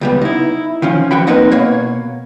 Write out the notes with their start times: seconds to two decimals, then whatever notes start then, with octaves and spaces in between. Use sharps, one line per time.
0.01 C#2 G3 B3
0.22 D#4 E4
0.82 D#3 F3 C#4
1.11 F3 F#4 G5 B5
1.27 A#3 C4 D#4 F#4 A#4 B4
1.51 B2 A#3 C#5